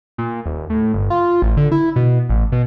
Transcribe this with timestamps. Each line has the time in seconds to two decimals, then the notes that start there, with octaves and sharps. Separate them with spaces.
0.18 A#2
0.46 D#1
0.70 A2
0.94 G1
1.10 F4
1.42 A1
1.57 D3
1.72 E4
1.96 B2
2.29 A1
2.52 B2